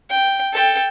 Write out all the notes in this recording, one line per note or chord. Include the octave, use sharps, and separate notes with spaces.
G5
A4 G5